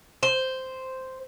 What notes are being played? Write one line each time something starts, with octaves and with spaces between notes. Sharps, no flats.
C5